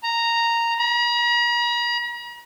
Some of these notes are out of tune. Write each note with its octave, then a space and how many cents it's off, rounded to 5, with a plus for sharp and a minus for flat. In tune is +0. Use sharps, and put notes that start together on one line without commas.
A#5 -5
A#5 +45